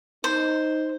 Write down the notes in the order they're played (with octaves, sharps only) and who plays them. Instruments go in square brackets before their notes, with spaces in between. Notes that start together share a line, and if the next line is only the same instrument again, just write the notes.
[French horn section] D#4 [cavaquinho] C5